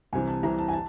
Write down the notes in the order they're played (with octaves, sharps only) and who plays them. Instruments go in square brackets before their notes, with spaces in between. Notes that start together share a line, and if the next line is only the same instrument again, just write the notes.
[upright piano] C2 C3 E3 G#5
A5
C2 C3 E3 A#5
A5
G#5
A5